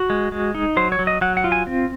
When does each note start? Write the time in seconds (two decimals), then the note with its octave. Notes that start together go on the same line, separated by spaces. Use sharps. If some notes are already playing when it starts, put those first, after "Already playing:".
Already playing: F#4
0.10 G#3
0.32 G#3
0.55 D#4
0.77 F#3 C5
0.92 C#5
0.99 F#3
1.07 D#5
1.21 F#3 F#5
1.37 F#5
1.44 F4
1.52 G#5
1.67 C4